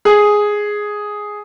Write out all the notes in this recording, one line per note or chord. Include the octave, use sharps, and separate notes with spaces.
G#4